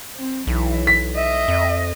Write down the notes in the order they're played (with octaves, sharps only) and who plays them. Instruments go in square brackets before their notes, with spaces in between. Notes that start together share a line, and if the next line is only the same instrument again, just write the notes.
[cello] C4
[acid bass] B1 [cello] E3
[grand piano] B6
[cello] D#5 [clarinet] E5
[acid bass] F2